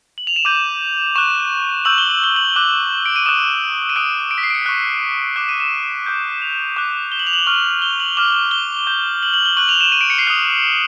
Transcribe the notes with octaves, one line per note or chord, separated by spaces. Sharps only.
F#7
F7
E7
D6 G6 D#7
C#6 F#6 E7
C#6 E6 G6 F#7
G7
F#7
G7
F#7
D6 F#6
D7
D#7
D#6 F#6 E7
D#7
D#6 F#6 D7
D7
B6
C7
D7
C#7
C#6 F#6
D6 F#6 E7
D#7
E7
D6 G6
F7
D6 F#6
G7
F#7
F7
F#7
C#6 F6
G7
F#7
D6 F6 G7
G7
D6 G6
F#7
F#7
G7
C#6 F#6 F#7
F7
E7
D#7
D7
C#7
C7
D#6 F#6 F7